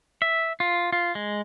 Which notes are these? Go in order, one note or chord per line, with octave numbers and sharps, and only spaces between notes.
E5
F4
F4
G#3